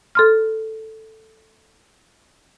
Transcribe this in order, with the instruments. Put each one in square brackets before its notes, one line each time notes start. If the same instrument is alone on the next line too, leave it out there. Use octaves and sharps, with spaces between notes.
[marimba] A4 C6 F6